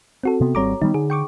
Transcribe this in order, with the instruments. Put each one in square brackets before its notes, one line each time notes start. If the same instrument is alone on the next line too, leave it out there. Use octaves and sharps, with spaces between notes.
[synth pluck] C4 F#4 A4
[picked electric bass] C3 B3
[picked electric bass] G#1 G3 C4 [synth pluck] C#5 A#5 D6
[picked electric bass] D#3 G3 B3 [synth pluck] D#4
[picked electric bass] D3 [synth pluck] G#4
[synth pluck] G5 C#6 D6